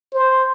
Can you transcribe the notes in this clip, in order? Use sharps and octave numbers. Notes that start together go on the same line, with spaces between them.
C5